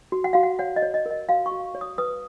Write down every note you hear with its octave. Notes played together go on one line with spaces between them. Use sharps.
F#4
F#5
F#4 F5
F#5
C#5 F#5
D#5
C#5
D#5
A#4 D#5
F#4 F5
C#6
F#4
C#5
D#6
B4 D#6